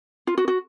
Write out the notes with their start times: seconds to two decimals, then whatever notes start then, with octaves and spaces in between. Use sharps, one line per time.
0.27 F4
0.37 F#4
0.48 F#4